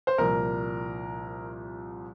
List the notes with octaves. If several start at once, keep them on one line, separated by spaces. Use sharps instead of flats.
C5
C2 A#2 F3 A#4